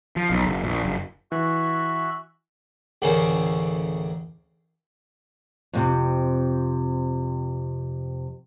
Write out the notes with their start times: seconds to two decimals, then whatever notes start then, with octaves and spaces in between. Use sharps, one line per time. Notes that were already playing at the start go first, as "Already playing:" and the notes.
0.16 F3
0.30 B1
0.45 F#1
0.63 A#1
0.84 F#1
1.32 E3 F#4 E5 F#6
3.02 A1 D2 C#3 A#3 C#4 C5
5.73 F2 A2 C3